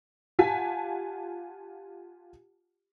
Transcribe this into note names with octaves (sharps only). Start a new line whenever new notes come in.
F4 G4 F#5 G#5 A5 B6